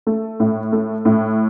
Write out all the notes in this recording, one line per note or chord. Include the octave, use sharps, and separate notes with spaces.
A3
A2
A3
A2